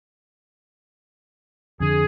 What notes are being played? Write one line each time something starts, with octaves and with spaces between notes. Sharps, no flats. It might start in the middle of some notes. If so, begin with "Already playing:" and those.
F2 D3 G#4